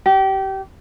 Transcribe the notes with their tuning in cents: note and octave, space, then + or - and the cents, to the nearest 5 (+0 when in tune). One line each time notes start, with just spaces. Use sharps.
G4 -25